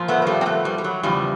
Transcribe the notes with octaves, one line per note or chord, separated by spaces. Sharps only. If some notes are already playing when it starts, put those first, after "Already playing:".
Already playing: A#2 F3
A3 B3
A#3
G3 A3
C4
A3 B3
G3
G3
F#3
E2 C#3 F3 G3